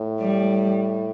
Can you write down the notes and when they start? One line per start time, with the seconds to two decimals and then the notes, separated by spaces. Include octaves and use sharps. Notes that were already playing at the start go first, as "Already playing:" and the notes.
Already playing: A2
0.21 G3